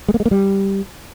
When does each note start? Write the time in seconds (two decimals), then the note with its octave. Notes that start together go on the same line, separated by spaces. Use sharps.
0.08 G#3
0.14 A#3
0.20 G#3
0.26 A#3
0.31 G3